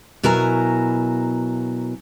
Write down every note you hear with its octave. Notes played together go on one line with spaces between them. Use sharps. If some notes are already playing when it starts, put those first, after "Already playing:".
B2 F#3 E4 A#4 G#5 A#5